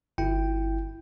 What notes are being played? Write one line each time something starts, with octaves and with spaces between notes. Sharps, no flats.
G1 E4 G5